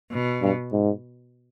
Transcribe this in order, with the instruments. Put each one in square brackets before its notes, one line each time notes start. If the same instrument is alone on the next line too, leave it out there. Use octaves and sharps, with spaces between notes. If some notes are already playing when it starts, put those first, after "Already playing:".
[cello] B2
[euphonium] G2
G#2